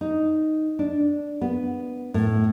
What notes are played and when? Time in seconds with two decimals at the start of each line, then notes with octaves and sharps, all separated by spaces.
0.01 D#4
0.79 D4
1.41 B3
2.14 A2